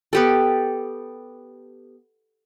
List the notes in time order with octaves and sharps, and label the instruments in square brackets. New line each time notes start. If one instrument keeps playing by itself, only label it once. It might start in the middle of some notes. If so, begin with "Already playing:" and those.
[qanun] B3 G4 A4